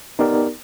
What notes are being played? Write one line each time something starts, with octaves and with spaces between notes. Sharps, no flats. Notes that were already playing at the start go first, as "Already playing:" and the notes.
B3 D#4 G4 A#4 D5